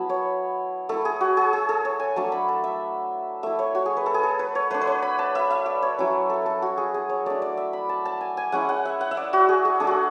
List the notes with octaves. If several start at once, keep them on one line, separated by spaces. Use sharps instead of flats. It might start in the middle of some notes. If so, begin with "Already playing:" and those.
Already playing: F#3 B3 E4 A5 B5
C#5
A3 E4 A4
G#4
F#4
G#4
G#4
A4
C#5
G#5
F#3 A3 D4 A5
B5
A5
E5
A3 E4 E5
C#5
F#4
G#4
B4
A4
G#4
A4
B4
C#5
A3 D4 B4
B4
C#5
B5
A5
E5
E5
D5
C#5
F#3 C#4 E4
A4
A4
F#4
G#4
G#4
C#5
A3 D4 D5
D5
E5
B5
A5
A5
G#5
G#5
G#3 C#4 E4 F#5
F#5
E5
F#5
E5
D5
F#4
G#4
G#4
A3 D4 G#4
F#4